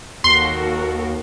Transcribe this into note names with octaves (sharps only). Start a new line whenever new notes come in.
D#2 F#4 A4 A#4 C6